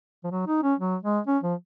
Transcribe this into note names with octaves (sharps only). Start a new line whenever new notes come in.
F3
F#3
D#4
C#4
F#3
G#3
C#4
F3